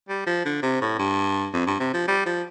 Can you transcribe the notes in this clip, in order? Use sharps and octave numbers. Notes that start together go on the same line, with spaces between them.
G3
F3
D3
C3
A2
G2
F2
G2
C3
F3
G3
F3